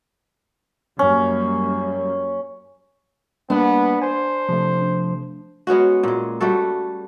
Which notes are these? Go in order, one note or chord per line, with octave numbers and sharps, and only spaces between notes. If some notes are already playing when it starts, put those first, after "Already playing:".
F#2 G3 A#3 C#4
G3 A#3 B3 D4
C5 G#5
C3 F3 A3
G#3 B3 C#4 F#4
A#2 G#3
G3 A3 F#4 A4